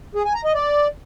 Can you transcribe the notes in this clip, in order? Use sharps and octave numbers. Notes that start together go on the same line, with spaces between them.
G#4
G#5
A#5
D#5
D5